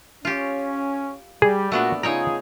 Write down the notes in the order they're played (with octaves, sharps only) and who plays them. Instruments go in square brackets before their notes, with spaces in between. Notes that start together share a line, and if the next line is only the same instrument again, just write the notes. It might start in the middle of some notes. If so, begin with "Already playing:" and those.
[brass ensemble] C#4 [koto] F4 G4
[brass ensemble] G3 [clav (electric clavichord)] G#4
[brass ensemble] A#2 F#4 [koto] A3 B3 D4
[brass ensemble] C#3 F4 G#4 [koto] D#4 C#5 G5 [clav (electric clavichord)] A#5